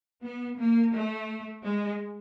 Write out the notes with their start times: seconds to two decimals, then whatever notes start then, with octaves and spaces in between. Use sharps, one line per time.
0.23 B3
0.58 A#3
0.93 A3
1.64 G#3